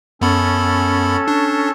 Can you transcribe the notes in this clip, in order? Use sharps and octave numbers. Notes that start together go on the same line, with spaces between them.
F#2 B3 C#4 A4 B5
D4